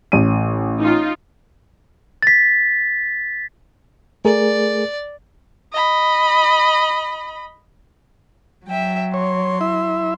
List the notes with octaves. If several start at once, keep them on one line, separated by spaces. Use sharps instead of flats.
A1 D#7
D#4 F4
A6 B6
A3 G#4 A#4 D5
D#5 B5
F#3 E5 G5
C#5 C6
E4 E5